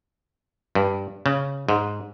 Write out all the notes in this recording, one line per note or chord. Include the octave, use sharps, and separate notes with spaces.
G2
C#3
G#2